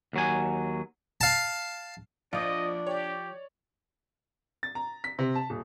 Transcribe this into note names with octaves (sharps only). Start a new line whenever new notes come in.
D#2 F#3 G#5
F5 A5
A#1 F3 D4 F4 D5 D#5
G4 C#5 D5
A6
A#5
B6
C3
A5
D#1